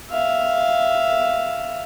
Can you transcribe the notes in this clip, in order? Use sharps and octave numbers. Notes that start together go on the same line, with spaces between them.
E5 F5